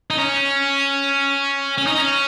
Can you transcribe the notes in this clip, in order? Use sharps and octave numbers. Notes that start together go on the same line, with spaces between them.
D#4
C#4
C#4
D#4
C#4